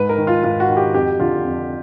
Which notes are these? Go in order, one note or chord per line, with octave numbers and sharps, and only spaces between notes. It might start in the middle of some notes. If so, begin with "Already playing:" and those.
Already playing: G#2 B4
A#4
D#3
F4
G#2 F4
F#4
D#3
G4
F2 G4
D3 F4
F2